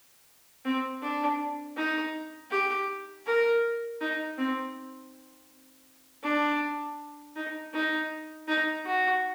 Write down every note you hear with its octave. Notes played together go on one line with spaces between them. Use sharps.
C4
D4
D#4
G4
A#4
D#4
C4
D4
D#4
D#4
D#4
F#4